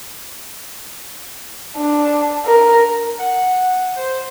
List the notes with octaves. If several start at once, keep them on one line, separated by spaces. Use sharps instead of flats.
D4
A#4
F#5
C5